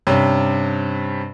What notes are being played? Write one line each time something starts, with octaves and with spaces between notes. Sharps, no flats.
G2 C3 C#4